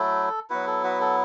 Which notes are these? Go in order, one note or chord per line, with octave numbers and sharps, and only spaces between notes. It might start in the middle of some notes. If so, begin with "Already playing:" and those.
Already playing: F#3 A3 E4 A4
F#3 B3 E4 F#4 B4
A4
F#4 B4
A4